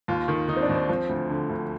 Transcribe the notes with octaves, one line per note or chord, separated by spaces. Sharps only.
D#2 F4
D#3
D#3 D#4
C4
D4
D#2
C4
F3 C4
D2
D3
D2